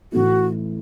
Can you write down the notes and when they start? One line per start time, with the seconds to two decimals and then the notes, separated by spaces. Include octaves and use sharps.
0.12 A1 A2 A3 E4 F#4